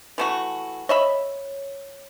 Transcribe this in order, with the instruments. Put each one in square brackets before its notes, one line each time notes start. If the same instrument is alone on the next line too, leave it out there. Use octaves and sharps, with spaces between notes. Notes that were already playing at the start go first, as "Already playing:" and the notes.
[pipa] E3 A3 F#4
[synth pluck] C#5 [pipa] D#5 E5 B5